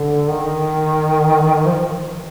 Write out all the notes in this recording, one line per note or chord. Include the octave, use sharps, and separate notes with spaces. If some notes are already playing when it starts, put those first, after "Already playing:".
Already playing: D3
D#3
F3